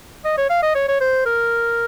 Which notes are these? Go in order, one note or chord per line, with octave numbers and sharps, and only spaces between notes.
D#5
C#5
F5
D#5
C#5
C#5
C5
A#4